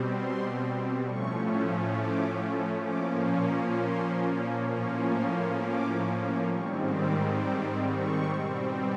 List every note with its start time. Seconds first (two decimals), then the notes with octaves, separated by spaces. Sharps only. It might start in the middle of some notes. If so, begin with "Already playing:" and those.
Already playing: B2 G3 C4
0.10 C6
1.01 A2 F3 A3 C#4 C#6
1.93 D6
2.83 A#2 F3 A#3 C#4 D6
3.29 C#6
3.75 C6
4.66 A2 F3 A#3 C#4 C#6
5.11 C6
5.57 D6
6.48 G#2 D#3 G3 C4 C#6
6.94 D6
7.39 D6
7.85 C#6
8.31 B2 G3 C4